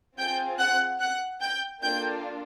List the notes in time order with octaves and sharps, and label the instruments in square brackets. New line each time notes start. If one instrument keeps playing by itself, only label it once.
[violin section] C4 F4 G#4 G5 G6
F#5 F#6
F#5 F#6
G5 G6
A#3 D4 F4 A4 G5 G6